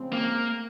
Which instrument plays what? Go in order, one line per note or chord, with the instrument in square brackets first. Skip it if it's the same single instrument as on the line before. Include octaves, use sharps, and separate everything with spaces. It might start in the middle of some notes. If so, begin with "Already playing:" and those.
Already playing: [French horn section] C#3 F3 G#3 C4
[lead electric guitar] A#3